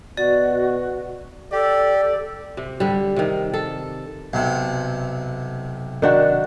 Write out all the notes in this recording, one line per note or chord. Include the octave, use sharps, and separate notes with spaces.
B2 F#4 D5
G4 A4 D5
C3
D3 G3
C3 D#3
A4
B1 C3
D#3 D4 F#4